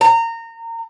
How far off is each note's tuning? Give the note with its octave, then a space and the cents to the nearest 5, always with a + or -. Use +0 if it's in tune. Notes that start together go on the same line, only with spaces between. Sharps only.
A#5 -25